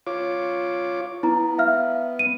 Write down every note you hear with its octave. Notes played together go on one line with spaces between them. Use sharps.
F4 C#5 D6
B3 E4 A#5
E5 F5 F6
D#7